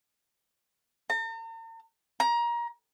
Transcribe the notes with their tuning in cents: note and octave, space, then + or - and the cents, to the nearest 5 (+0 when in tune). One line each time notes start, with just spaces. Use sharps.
A#5 -45
A#5 +25